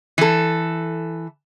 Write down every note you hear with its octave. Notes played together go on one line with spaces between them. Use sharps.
E3 A4